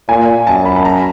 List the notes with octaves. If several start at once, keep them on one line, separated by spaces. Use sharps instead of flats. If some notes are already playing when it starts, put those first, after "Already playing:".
A#2 G#5
F#2 A5
B5
B5
A#5